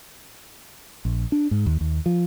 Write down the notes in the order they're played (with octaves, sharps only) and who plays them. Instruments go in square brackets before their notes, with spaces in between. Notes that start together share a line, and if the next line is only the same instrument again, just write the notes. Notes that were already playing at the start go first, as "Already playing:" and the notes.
[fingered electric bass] A#1
D4
G#2
D#2
D#2
F3